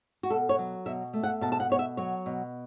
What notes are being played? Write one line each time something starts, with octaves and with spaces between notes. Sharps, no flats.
F#4
B2 A4
C#5
F#3
B2 E5
A3
F#5
B2 A5
A5
F#5
B2 C#5
E5
F#3 C#5
B2